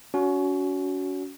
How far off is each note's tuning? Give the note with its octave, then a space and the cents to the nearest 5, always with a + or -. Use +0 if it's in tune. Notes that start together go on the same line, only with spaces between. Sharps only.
C#4 +30 F#4 +0